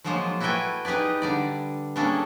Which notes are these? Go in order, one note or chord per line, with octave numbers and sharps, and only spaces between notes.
F3 F#3 G#3 A#3 F4 C5
E4 F#4 A4 B4 G5 G#5
D#4 G4 G#4 B4 D5
D3 G3 D5
G3 A#3 C#4 D4 G#4 A4